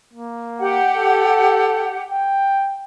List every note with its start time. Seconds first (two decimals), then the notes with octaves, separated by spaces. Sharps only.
0.14 A#3
0.59 G4 F#5
0.96 A4
2.11 G5